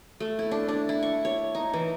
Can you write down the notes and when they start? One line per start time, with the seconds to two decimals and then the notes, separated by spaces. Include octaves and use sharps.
0.20 A3
0.39 E4
0.51 D4
0.69 D4
0.89 E4
1.03 C#6
1.25 C#5
1.55 D#4
1.74 E3